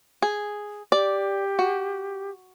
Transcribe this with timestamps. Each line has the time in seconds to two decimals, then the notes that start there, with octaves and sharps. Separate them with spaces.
0.22 G#4
0.92 G4 D5
1.59 F#4